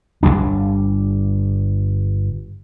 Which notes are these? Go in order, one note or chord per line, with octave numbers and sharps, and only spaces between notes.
G1 G2 G3 D4